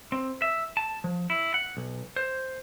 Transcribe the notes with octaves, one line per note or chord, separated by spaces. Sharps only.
C4
E5
A5
F3
E4
F#5
B1
C5